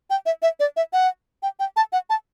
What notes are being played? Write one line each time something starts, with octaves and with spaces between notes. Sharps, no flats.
G5
E5
E5
D5
E5
F#5
G5
G5
A5
F#5
A5